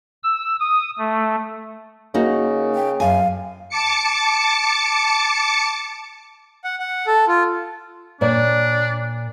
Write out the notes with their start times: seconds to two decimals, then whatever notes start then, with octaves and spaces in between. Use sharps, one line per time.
0.23 E6
0.60 D#6
0.98 A3
2.14 C#3 A#3 D#4 F#4
2.75 G5
3.00 F#2 F5 G#5
3.69 A5 D6 C#7
6.64 F#5
6.79 F#5
7.07 A4
7.28 F4
8.21 A#2 D4 C#5 D5